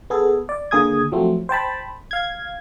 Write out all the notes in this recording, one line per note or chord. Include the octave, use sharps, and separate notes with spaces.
B3 G#4 A4
D5
D3 A#3 G#4 D#6 G#6
F3 F#3 A3 C4
C5 G5 A5 B5
F5 G#6